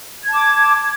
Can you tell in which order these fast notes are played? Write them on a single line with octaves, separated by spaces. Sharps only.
G#6 A5 D6